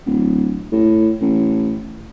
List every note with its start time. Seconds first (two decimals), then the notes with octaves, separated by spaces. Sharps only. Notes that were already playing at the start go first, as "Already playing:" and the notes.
0.06 D1
0.72 A2
1.21 A1